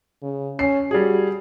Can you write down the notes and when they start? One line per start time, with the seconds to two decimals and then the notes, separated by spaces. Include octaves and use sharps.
0.22 C#3
0.59 C#4 C7
0.91 G3 F#4 G#4